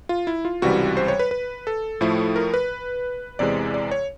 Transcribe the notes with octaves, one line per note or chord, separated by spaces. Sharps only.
F4
E4
F4
C#2 C3 E3 G3 F#4
C5
C#5
B4
B4
A4
A2 F3 A3 E4
A#4
B4
E2 C3 E3 G#3 D5
D5
C#5